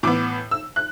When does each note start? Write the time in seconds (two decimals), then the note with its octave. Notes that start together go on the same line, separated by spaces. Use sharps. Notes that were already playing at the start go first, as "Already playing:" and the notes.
0.03 A2 E3 B3 D6
0.51 E6
0.76 F#6